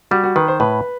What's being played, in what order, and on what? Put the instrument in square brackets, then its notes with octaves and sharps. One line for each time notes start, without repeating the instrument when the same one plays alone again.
[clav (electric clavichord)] G3 [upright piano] F#4
[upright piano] F#4
[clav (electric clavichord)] D#3 [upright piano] B4
[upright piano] C5
[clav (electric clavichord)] A2 [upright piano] B4